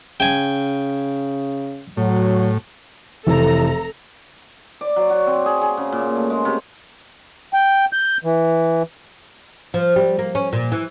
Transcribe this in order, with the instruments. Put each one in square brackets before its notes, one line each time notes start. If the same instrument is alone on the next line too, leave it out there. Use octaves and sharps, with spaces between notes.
[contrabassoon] C#3 [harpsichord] G5 G#5
[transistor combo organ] A2 [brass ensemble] F#3
[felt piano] F1 E3 [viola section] A4 A#5
[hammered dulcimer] D5
F#3
F#4
C4
G#4
G#4
C#3
A#2
A3
G#3
C3
[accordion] G5
G6
E3
[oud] F3
G3
A#3
C#4
A#2
E3